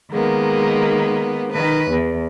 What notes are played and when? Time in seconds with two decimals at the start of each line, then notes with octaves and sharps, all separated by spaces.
0.11 D#3 G#3 A#3 B3
1.51 D#3 B4
1.90 E2